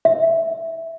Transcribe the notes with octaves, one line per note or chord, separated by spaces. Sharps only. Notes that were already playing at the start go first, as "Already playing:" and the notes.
E5